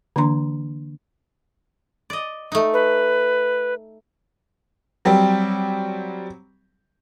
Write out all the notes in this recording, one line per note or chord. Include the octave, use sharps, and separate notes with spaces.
D3 E3 A#3 D4 A#5 C6
D5 D#5
A3 D#4
B4
F#3 G3 C4 G4